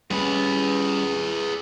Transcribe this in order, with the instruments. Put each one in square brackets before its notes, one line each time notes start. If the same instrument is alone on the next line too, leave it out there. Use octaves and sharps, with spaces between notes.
[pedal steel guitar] G3 C#4 B5 [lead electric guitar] G#4 B4